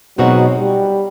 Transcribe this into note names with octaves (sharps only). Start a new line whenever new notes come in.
B2 F#3 G#3 C4 D#4 F#4
G3